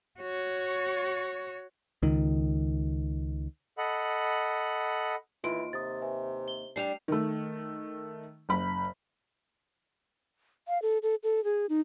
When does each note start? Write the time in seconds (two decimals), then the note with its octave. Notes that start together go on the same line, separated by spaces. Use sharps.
0.20 F#4 C#5
2.03 C#2 D#3
3.78 A4 D#5 F#5 B5
5.44 D#2 E3 F4 C6 D7
5.73 C3 D#6 A6
6.02 B4 E5 G#5
6.48 G7
6.76 G3 D4 C7 F7
7.08 D#3 A3
8.49 F#1 B5
10.68 F5
10.82 A4
11.03 A4
11.23 A4
11.44 G#4
11.69 D#4